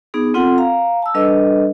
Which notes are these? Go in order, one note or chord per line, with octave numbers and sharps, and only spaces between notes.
B3 D#4 G#4
C4 F4 A4 F#5
F5 A#5
A5 E6
G3 D4 A4 B4 D#5